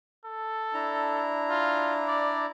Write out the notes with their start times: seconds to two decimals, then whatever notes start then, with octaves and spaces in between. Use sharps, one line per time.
0.25 A4
0.74 D4 E4 A#5
1.50 F4
2.08 D5